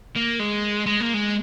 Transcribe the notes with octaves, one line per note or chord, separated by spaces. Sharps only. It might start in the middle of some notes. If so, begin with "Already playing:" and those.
A#3
G#3
G#3
A#3
G#3